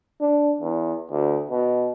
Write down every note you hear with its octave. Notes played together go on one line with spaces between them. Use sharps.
D4
E2
D2
B2